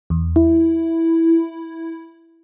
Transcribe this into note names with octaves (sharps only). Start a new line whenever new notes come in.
E2
E4